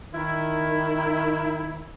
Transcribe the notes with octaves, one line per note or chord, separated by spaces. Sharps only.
D#3 E4